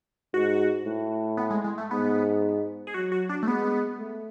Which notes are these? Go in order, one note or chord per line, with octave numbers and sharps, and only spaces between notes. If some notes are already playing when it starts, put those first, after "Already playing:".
G#2 F#4
A2
B3
G#3
G#3
A3
G#2 B3
G#4
F#3 F#4
F#4
D4
A3
G#3 B3
A3